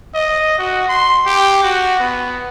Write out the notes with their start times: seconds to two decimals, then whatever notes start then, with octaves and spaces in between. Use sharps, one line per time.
0.14 D#5
0.59 F#4
0.89 C6
1.26 G4
1.63 F#4
2.00 B3